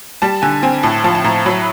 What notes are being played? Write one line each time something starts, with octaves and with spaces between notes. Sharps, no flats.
G3 A5
D3 G#5
C4 G#5
A2 A5
F3 A5
A5
A2 A#5
F#3 B5